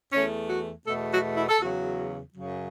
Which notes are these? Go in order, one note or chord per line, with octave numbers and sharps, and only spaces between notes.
E2 E3 A3 C#4
F#4
E2 B2 A3 A4
F#4
E4
A4
E2 C#3 F#3 F#4
F#2 C#3 F#3